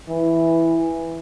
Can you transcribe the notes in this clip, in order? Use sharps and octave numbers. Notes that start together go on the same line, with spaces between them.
E3